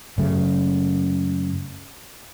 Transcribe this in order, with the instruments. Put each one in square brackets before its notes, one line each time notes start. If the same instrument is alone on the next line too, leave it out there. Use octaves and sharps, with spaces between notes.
[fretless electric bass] F#2 C#3 A3